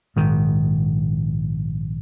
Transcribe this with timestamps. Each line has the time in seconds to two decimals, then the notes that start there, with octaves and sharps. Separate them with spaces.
0.16 A#1 G#2 D#3